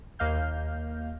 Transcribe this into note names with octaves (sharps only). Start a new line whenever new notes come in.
D#2 A#3 D#5 F5 F6 G6